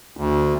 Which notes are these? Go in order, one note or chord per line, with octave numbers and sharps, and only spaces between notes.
D2